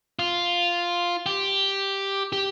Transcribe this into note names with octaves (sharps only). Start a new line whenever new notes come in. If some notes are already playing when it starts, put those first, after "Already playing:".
F4
G4
G4